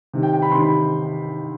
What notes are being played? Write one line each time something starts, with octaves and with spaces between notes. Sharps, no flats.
C3 D#3
G5
G5
B5
C3 D#3 C6
B5